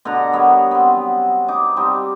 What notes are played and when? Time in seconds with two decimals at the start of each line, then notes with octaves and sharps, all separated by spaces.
0.05 B2 D3 F#5 A#5
0.32 G3 B3 A#4 C#5
0.71 B3 C4
0.95 F#3
1.48 D#4 D6
1.76 G3 C4 D#4